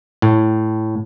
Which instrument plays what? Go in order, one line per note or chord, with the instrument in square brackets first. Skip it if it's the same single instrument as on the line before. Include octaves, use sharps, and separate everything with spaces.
[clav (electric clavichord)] A2